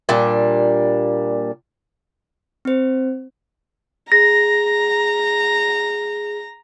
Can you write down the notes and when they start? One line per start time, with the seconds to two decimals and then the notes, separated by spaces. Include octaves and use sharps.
0.09 A#2 G3 D4
2.65 C4 C5
4.12 G#4 A#5 A#6